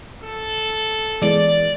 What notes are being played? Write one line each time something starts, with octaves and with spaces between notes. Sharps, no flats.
A4
E3 G#3 B3 D5